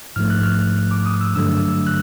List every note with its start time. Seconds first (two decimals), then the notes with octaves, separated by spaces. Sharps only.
0.16 G#2 F3 A3 F6
0.30 F#6
0.43 F6
0.91 D6
1.06 D#6
1.21 E6
1.35 G2 D3 F#3 A3 E6
1.87 F#6